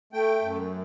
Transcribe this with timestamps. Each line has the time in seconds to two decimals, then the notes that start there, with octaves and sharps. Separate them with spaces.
0.13 A3 G5
0.42 F#2